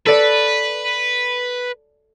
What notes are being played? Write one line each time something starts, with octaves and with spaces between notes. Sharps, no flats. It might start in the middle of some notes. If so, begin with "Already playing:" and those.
A4 B4 D5